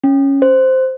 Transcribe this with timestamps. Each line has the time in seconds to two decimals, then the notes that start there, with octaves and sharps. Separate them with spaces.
0.04 C#4
0.42 C5